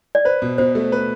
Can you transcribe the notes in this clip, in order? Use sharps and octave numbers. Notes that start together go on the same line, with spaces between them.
D5
B4 C5
B2
B2 C5
A3
B4